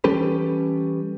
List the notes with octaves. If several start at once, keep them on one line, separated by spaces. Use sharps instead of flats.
E3 G3 C#4 G4 A4 B4